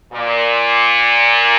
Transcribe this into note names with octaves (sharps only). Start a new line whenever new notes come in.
A#2